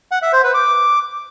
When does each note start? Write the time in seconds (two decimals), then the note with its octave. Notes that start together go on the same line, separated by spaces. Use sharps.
0.11 F#5
0.22 E5
0.33 C5
0.44 B4
0.54 D6